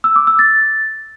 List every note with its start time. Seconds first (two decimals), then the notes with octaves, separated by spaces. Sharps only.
0.04 E6
0.16 D6
0.27 E6
0.39 A6